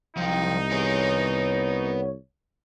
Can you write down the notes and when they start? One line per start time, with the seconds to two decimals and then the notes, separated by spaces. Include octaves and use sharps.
0.17 C2 F3 F#3 D#4 G5
0.71 B3 G#4 C#5